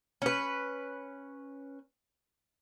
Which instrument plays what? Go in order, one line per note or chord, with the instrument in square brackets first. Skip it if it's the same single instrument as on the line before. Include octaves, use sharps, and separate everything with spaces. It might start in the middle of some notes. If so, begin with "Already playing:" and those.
[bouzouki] C#4 B4